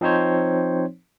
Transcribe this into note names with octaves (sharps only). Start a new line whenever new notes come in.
F3 C4 D#4 C5 C#5